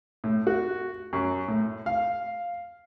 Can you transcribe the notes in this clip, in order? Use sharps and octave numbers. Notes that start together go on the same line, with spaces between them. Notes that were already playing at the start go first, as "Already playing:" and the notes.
A2
F#4
F#2
A2
F5